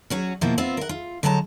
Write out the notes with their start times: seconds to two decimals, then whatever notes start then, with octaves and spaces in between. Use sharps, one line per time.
0.10 F#3 C#4 F#4
0.41 B2 F3 A#3 E4 F4
0.58 B3 C4 F4 E5
0.77 A#4 F#5
0.89 F4
1.23 D3 F#3 G#3 A5 A#5